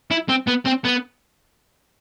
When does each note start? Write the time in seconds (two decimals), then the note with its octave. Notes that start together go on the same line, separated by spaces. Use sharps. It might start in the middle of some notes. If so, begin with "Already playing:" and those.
0.11 E4
0.29 C4
0.48 B3
0.66 C4
0.85 B3